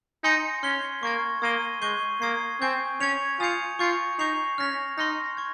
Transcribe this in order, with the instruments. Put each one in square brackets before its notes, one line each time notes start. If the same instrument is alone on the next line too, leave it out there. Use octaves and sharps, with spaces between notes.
[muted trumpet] D#4 [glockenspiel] G#5 C6 G6 A#6 C#7
[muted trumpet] C#4 [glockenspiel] C6 F6 C7 G7
[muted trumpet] A#3 [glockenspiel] C#6 F6 G#6
[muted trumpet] A#3 [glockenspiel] D#6 G#6 C7 D#7 G7
[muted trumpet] G#3 [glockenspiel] C#6 G6 C7 D#7 G7
[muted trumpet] A#3 [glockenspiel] D#6 G#6 C7
[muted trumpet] C4 [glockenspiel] G#5 C#6 G6
[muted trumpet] C#4 [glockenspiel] C#6 G#6 C#7 F7
[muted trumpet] F4 [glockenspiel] G#5 D#6 G6 C#7 F7
[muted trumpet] F4 [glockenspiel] C#6 G6 A#6 C#7
[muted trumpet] D#4 [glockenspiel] C#6 G6 C7 F7
[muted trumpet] C#4 [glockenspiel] F6 A#6 F7
[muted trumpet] D#4 [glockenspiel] C6 F6 A#6
[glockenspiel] C#6 G#6